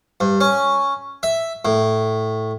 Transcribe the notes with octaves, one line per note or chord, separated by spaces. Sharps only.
G2
C#4
E5
A2